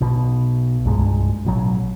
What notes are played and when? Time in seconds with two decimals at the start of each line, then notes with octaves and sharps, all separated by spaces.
0.01 B1 B2
0.85 C2 G2 A#2 G#3
1.45 A1 B2 F#3